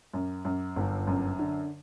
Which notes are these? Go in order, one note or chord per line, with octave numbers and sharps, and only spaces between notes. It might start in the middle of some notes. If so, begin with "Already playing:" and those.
F#2
F#2
G1
F#2
D3